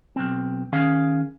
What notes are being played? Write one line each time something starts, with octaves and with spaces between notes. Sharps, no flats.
B1 C4
D#3 C#4 G#4 F5